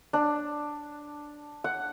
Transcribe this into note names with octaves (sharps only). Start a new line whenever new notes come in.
D4
F#5